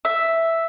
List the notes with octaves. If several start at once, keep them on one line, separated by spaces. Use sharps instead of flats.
E5